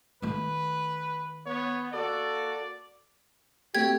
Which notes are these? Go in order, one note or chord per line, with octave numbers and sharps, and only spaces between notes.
D#3 A3 B4
B3 C#5
A#3 F#4 A4 D5
A3 C4 F#4 G4 G#6